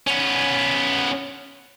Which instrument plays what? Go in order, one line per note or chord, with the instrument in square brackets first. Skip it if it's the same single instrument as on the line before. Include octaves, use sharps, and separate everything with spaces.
[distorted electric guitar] B3 C#4